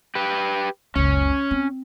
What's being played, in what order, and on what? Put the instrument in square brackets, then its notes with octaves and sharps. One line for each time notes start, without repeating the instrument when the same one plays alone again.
[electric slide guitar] G4 B4
[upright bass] F#1 C#2 [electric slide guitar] C#4
[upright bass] C4